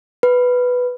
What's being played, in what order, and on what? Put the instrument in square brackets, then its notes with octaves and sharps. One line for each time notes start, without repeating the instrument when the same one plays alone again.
[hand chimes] B4